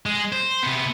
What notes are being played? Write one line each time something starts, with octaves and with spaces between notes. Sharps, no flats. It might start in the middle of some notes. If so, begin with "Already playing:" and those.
G#3
C5
C3 B3